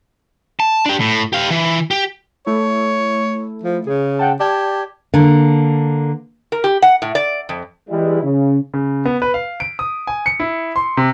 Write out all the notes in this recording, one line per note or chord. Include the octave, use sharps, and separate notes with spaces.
A5
D4 G4
A2
G4 F5
E3
G4
A3 E4 C#5
F3
C#3 G#4
F#5 G5 A5
G4 D5 A5 G#6
D3 A#3
A#4
G4
F#5
A2
D5
F2
E3 G3 G#3 E4
C#3
C#3
B3
B4
F5
D7
D#6
G#5
C#7
E4
C6
C3